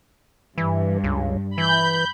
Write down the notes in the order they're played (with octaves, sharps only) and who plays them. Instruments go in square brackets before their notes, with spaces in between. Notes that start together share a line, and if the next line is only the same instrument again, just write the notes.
[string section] G2 [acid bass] E3
[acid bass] C#2
[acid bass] E3 [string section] B5 G6